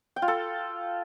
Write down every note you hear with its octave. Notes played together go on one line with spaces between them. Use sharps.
G5
F4
A4